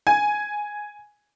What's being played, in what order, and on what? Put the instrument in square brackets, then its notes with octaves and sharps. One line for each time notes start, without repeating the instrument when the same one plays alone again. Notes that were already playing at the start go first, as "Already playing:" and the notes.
[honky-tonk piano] G#5